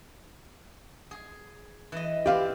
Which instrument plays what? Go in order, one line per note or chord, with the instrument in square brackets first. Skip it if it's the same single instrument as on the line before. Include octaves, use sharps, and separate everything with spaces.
[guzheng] G#4
E3 D#5
[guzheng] C4 B4 D5 [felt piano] G4 F5